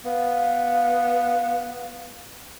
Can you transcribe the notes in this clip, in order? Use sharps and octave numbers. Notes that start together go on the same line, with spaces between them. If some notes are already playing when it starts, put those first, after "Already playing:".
B3 F5